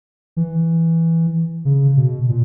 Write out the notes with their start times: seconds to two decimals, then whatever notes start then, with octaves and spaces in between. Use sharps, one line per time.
0.37 E3
1.65 C#3
1.97 B2
2.29 A#2